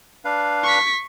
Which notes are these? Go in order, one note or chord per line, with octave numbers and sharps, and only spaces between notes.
D4 B4 F5
C#6 B6